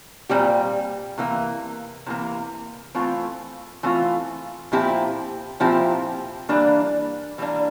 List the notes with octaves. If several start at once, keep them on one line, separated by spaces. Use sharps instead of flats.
A#2 G3 C4 G4
C3 E3 A#3
C3 E3 A#3
E3 A3 C4 F4
E3 A3 C4 F4
A#2 F3 C4 E4 G4
A#2 F3 C4 E4 G4
E3 G3 A#3 D4
E3 G3 A#3 D4